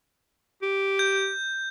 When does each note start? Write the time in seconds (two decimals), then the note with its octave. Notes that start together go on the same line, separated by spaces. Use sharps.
0.62 G4
0.99 G6